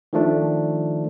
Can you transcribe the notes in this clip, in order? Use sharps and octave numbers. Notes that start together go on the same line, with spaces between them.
D#3 F3 A3 D4